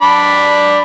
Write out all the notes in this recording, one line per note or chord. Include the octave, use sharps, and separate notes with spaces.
D4 D5 B5